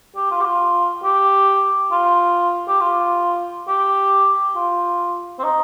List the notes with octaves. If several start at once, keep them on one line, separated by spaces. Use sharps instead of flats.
G4
F4
G4
F4
G4
F4
G4
F4
G4
F4
C4
D#4